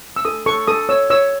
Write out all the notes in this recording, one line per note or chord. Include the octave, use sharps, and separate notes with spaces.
E6
A4 D#6
A4 C#6
A4 D#6
C#5 E6
C#5 E6